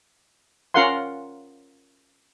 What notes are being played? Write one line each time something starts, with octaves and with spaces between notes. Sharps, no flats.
C#4 F4 A#4 F5 F#5 C6